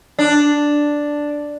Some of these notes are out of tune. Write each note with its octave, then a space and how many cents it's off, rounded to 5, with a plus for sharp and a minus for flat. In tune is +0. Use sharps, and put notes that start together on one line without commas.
D4 +0